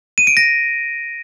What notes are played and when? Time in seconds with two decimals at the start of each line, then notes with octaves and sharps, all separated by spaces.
0.18 D#7
0.27 D7
0.37 A#6